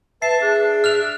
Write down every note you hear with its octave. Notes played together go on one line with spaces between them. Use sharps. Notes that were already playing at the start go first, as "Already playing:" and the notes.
B4 E5 A5 C7
D4 G#4
E5 F6 F#6 F7